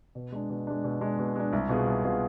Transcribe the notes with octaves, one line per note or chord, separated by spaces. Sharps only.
B2
G#3 D4
B2
G#3 D4
B2
G#3 D4
B2
G#3 D4
C2
B2 B3 F4 G#4
C2
B2 B3 F4 G#4